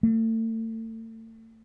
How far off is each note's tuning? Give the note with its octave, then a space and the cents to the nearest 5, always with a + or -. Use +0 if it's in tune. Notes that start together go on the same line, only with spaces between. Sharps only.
A3 +35